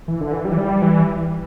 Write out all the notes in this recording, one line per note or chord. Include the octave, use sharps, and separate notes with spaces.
E3
D3
E3
G3
E3
G3
E3